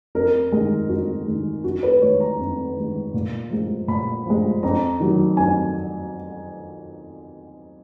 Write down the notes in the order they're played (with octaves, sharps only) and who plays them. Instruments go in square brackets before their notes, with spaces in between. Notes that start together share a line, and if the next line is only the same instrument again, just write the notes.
[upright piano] F2 A#4
D#3 G#3
F2 F#4
D#3 G#3
F2 F#4
B4
D#3 G#3 C#5
A#5
F2
D#3 G#3
A#2
F3 G#3
A#2 B5
F3 G#3
F2 A#5
D#3 F#3
F2 G#5